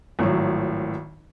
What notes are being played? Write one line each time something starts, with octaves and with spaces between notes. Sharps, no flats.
G#1 A2 F3 F#3